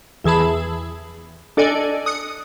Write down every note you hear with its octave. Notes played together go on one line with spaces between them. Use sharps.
E2 E3 G#4 A5 B5
D4 A4 D5 D#5 G#5
D#6 F#6 C#7